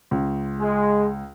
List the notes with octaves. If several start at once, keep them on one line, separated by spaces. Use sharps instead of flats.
C#2
G#3